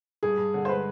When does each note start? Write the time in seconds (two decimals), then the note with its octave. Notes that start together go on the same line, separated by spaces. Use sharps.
0.23 G2 G#4
0.38 G2
0.54 D3
0.65 C5
0.68 G#3 B4